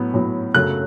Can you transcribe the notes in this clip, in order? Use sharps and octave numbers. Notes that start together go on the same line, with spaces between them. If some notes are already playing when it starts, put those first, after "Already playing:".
Already playing: A2 F#3 B3
A2 F#3 B3
F#2 C#3 F#3 A3 F#6